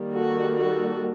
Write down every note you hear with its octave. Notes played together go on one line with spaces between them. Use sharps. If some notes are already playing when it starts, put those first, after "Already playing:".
Already playing: D#3 G3 A#3
F#4 A4
F#4 A4